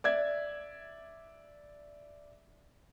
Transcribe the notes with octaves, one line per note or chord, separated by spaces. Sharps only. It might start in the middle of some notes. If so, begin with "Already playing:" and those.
D5 E5 G#6